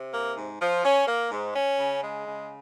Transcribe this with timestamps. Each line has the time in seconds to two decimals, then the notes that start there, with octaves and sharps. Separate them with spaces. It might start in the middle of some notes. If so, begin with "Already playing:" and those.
Already playing: C3
0.13 A#3
0.37 G#2
0.61 F3
0.85 C#4
1.07 A#3
1.31 G#2
1.56 C#4
1.79 C#3
2.03 G#3
2.26 C#3